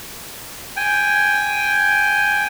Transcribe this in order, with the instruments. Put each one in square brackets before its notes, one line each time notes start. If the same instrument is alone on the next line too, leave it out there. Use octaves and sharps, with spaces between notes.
[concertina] G5 G#5